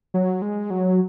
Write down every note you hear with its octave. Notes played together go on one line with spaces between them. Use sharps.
F#3
G#3
F#3